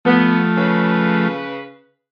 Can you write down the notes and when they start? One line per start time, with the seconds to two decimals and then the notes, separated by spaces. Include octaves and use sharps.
0.05 F3 A3 B3
0.56 C#3 B4